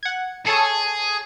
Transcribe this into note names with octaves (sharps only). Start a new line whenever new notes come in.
F#5 G#6
G#4 A4 C#5 A5